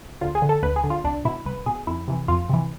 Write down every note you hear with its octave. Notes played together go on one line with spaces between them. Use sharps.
D2 F4
G#4
D3
A4
D2 B4
G#4
D3
F4
C2 D4
B2 E4
C2 B4
B2 G#4
F2 E4
C3 E3
F2 F4
C3 E3